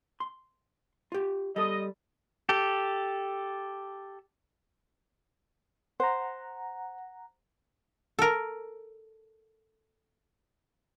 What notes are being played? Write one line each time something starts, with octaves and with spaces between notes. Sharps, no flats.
C6
F4 G4
G3 A4 D#5
G4 A4
C5 F#5 A#5
A4 A#4